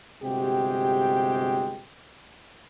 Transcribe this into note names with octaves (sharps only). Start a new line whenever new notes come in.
G1 C3 G#3 F#4 G4 G5